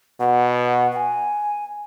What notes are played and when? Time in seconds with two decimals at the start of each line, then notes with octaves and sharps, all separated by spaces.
0.20 B2 F#5
0.92 F#5
0.96 G#5